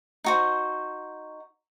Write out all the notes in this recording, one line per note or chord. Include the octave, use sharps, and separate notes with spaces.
D#4 F#4 C5